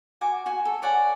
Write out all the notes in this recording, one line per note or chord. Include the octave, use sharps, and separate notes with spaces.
F#4 G#5 D6
F#4 G#5
A4
C#5 D5 F#5 G#5